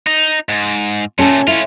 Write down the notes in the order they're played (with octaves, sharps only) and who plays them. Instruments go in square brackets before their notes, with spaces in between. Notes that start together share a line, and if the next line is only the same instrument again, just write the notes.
[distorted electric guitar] D#4
G#2
[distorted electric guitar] A#2 A3 [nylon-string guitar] C#4 A4
[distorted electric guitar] C#4 F4 [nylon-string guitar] E4